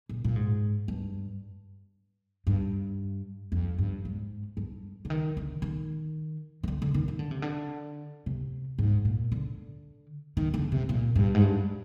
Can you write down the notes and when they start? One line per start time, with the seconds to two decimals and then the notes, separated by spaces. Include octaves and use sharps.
0.09 A#2
0.24 A#2
0.36 G#2
0.88 G2
2.47 G2
3.52 F2
3.78 G2
4.05 G#2
4.57 G2
5.05 D3
5.10 D#3
5.37 D3
5.62 D#3
6.63 D#3
6.68 D3
6.82 D3
6.94 D#3
7.08 D#3
7.19 D3
7.31 C3
7.42 D3
8.26 C3
8.79 G#2
9.05 A#2
9.32 D3
10.37 D#3
10.54 D3
10.72 C3
10.89 A#2
11.16 G2
11.34 G#2
11.42 G2